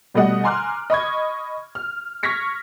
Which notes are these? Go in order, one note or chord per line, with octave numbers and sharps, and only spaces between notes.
B2 G3 A3 D#5 F#5
G#5 A#5 C6 D6 F6 F#6
D#5 B5 C#6 G#6
F6
C#6 F6 G#6 A#6 B6 C#7